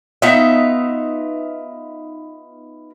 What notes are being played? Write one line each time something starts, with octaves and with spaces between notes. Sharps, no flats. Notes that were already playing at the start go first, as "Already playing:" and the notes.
B3 D#4 F4 E5